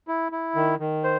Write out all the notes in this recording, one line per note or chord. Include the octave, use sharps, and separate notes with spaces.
E4
E4
D#3
D#3
C5